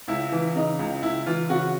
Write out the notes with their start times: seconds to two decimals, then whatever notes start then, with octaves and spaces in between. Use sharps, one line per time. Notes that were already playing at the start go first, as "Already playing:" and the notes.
0.08 C#2 E4
0.32 E3
0.55 C#3 D#4
0.79 C#2
1.03 C#2 E4
1.26 E3 F4
1.49 C#3 F#4